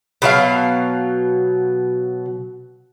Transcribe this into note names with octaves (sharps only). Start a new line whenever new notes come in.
B2 F#3 F5